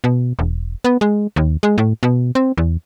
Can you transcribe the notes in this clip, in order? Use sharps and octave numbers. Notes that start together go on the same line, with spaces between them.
B2
E1
B3
G#3
D#2
G#3
A2
B2
C4
E2